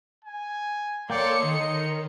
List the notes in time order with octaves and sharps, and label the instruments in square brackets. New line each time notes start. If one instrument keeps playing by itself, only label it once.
[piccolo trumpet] G#5
[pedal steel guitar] A#3 G5 D6 [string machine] A4 C#5 [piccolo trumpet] D5 [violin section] C6 C#7
[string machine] D#3 [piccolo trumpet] D#4 [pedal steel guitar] D#5